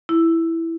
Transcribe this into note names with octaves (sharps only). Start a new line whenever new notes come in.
E4